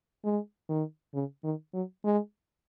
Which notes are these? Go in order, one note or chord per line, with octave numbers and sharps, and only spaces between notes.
G#3
D#3
C#3
D#3
F#3
G#3